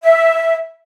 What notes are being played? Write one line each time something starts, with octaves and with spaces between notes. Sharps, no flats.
E5